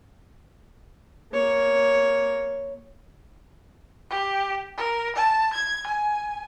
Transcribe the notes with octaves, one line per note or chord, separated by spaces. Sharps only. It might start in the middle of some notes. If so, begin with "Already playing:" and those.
A#3 C#5
G4
A#4
A5
G#6
G#5